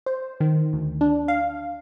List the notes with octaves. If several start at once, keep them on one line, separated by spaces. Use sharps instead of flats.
C5
D#3
D2
D4
F5